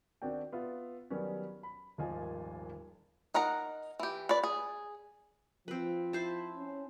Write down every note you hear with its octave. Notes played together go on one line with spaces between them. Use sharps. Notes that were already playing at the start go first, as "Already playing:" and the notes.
D#3 C4 D4 F#4 G5
B3 F4 E5
D#3 F#3 G3 B3 C#4
B5
D#1 G#1 F3 F4 D#5 G#5
D#4 A#4 F#5 A#5
E3 G4
B4 D5
G#4
F3 C4 B4
E4 C5 A5
C#4